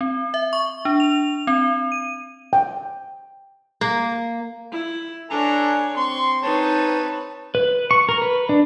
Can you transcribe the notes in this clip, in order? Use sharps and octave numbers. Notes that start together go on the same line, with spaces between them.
C4
E5
C#6
D4
F7
C4
D#7
G5
A#3
E4
D4 A4 C#5 G#5 A#5
C4 C6 C#6
D#4 B4 C#5 A5
B4
C#6
A#4
B4
D4